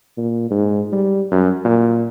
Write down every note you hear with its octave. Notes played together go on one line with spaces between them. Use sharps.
A#2
G#2
G3
F#2
A#2